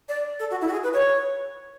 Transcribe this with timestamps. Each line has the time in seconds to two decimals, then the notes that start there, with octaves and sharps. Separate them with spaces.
0.09 D5
0.40 A4
0.51 F#4
0.61 E4
0.68 F#4
0.72 G#4
0.83 B4
0.93 C#5